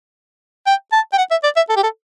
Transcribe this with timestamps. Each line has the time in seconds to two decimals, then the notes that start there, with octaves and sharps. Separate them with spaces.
0.67 G5
0.92 A5
1.13 G5
1.18 F#5
1.31 E5
1.44 D5
1.56 E5
1.69 A4
1.76 G4
1.83 A4